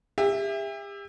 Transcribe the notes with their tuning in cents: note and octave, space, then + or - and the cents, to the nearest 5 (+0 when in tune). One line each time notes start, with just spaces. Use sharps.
G4 +40 E5 +0